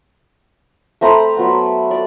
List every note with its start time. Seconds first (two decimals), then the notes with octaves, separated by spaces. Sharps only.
1.01 A3 C4 A#5 B5
1.37 F#3 B3
1.91 D5